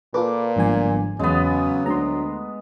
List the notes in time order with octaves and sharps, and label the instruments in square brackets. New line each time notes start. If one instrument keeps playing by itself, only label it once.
[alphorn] A#2 [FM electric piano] F4 A4 B4 [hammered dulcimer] D6
[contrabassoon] G1 [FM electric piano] G#2 F3 G#5
[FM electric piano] E2 [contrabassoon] C#3 [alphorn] F#3 [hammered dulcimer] G#3 B3
[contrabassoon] D2 [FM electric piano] A#5 C6